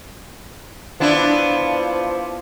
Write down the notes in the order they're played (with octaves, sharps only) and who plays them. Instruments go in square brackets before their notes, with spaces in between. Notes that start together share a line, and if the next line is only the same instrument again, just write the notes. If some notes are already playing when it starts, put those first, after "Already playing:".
[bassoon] F3 [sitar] B3 D4 E4